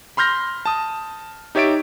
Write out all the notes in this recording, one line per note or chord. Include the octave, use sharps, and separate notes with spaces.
B5 C6 F6 G6 A#6
A5 D#6
D#4 G4 C#5 E5 A6 D7